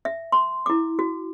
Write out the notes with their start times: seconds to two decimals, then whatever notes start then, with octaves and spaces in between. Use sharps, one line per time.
0.05 E5
0.32 C6
0.66 E4 D6
0.99 F#4